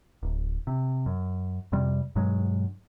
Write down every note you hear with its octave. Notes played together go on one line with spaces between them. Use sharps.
D1
C3
F#2
F2 C3 G3
G2 B2 F#3 G#3